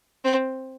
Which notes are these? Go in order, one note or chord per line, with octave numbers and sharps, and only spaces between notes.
C4